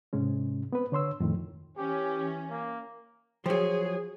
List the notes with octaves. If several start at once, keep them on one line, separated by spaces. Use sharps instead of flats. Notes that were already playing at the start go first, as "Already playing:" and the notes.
G#2 C3 G#3 C#4
B3 C4 B4
D3 C#5 C6 E6
F2 A2 D#3
E3 C#4 G4
A#3
F3 F#3 G#4